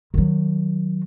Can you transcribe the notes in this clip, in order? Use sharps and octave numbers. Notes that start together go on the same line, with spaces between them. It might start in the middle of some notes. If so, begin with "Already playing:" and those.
D#3 F#3